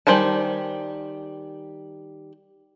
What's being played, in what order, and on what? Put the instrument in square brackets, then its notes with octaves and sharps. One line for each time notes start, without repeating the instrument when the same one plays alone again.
[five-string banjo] D#3 G3 C5 G#5 A5